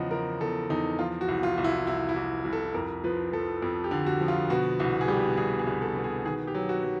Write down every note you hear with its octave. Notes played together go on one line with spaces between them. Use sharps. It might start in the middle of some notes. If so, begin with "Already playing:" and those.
Already playing: E2 C#3 F3 D#5 F#5
F3 A#4
E2 A4
E2 D#4
F3 F4
F#4
C2
F4
C2
E4
C2 E4
E4
C2
C2
A4
F2 A#4
F3 B4
F3 A4
F2
G4
D3
F#4
F3
F4
B2 F#4
C2 F#4
G#4
G3 G4
C2 G#4
G#4
C2
A4
B2
G#4
D#3 G#4
G4
F#3
F#4
F#3